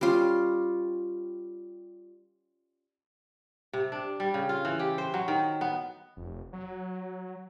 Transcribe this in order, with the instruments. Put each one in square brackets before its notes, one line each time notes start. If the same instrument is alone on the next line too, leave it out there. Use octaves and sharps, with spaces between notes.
[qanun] G3 C#4 F4
[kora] C3
D4
G3
C#3
F4
E3
G4
C5
F#3
D#3
B3
[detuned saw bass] F1
F#3